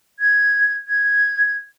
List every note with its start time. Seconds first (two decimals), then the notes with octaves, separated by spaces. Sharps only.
0.20 G#6
0.87 G#6